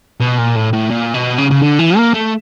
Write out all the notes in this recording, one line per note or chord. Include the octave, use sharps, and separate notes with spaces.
B2
A#2
A2
A2
A#2
B2
C#3
C#3
D3
E3
A#3
A3